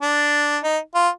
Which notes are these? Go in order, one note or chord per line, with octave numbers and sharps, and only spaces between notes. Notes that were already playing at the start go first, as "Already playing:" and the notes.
D4
D#4
F4